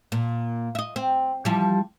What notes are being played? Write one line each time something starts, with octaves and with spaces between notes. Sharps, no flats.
A#2
D#5 E5
C4
E3 F3 G3